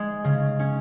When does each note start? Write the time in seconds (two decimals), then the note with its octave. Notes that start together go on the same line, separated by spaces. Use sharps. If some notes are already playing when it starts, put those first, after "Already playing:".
Already playing: G#3
0.24 C#3
0.59 C#4